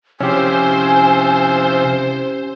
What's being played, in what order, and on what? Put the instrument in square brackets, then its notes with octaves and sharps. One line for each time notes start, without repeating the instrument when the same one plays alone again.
[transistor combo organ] C3 F3 E4 [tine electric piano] C#4 G4 [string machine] C5 [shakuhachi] G#5